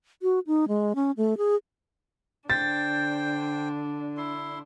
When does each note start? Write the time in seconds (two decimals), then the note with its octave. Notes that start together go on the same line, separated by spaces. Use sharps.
0.22 F#4
0.47 D#4
0.68 G#3
0.95 C#4
1.17 A3
1.38 G#4
2.50 D3 D4 C5 G5 A6
4.17 E4 C6